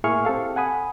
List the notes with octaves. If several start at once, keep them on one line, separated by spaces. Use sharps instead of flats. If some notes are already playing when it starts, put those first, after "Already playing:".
A2 A#3 E4 G#4 C#6 F6
C4 G4 A4 F5
F#5 G#5 B5 D#6